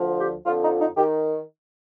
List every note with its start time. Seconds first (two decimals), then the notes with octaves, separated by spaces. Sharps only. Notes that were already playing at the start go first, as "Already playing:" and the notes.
Already playing: D2 D3 F3
0.19 G4
0.45 F2 D3 F3 F4
0.62 D#4
0.80 D#4
0.96 D#3 G4